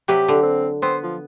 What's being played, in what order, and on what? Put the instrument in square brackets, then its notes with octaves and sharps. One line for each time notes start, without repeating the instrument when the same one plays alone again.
[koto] C3 F#3 B4 [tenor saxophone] G4
[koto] D3
[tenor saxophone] C4
[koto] B3 [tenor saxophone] C5
[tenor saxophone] F3